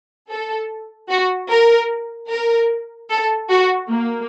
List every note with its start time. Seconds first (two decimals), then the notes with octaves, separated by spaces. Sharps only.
0.29 A4
1.09 F#4
1.49 A#4
2.30 A#4
3.09 A4
3.49 F#4
3.89 A#3